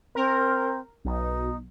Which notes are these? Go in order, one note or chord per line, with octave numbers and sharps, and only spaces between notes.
C4 A#4
B1 D#4